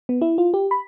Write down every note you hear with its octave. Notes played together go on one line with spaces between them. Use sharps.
B3
E4
F4
G4
B5